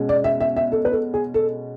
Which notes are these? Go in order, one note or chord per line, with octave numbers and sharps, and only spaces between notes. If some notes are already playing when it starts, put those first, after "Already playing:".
Already playing: B2 G#3 C#4
D5
E5
E5
E5
A4
B4
A4
G#4
A4